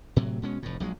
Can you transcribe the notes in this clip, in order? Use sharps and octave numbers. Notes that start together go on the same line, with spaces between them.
A2 C3 F#3
B2 G#3 C#4
F1 A2
A#1 F#3 G#3